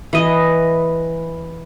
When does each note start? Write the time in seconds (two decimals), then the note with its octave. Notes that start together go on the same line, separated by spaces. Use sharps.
0.13 E3 D#5